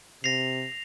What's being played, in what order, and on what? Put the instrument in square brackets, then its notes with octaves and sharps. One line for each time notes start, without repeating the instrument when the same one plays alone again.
[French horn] C3 [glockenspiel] A#6 C7 [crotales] F7